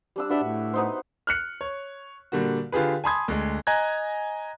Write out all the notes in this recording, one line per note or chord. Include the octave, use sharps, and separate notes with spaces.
G3 D4 E6
D4 F#4 B4 E5
A2
B3 D#4 C5
F6 F#6 C#7
C#5
A#2 D3 G3 A#3 F#4
D3 F4 G4 G#4 B4
G#5 A5 B5 C6 D#6 G#6
D2 G#3
D#5 G#5 A#5 F#6 G#6